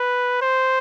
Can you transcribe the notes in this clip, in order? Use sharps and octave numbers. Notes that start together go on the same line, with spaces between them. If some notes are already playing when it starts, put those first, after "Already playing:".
Already playing: B4
C5